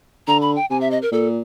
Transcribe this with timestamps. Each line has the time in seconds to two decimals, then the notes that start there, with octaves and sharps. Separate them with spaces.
0.28 D3 A#5
0.42 B5
0.56 G5
0.70 C3 G#5
0.81 E5
0.91 D#5
1.02 A#4
1.12 A#2 A4